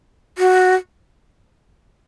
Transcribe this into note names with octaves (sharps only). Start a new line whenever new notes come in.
F#4